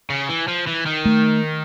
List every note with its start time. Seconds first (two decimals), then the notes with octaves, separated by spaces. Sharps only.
0.10 C#3
0.29 E3
0.48 F3
0.67 E3
0.86 D#3
1.05 A3